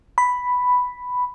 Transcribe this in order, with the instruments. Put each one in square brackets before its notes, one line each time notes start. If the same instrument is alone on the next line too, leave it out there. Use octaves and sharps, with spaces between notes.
[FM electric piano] B5